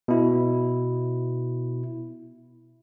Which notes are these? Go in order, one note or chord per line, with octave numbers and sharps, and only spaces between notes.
B2 E4